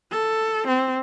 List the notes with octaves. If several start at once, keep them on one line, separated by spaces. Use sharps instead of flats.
A4
C4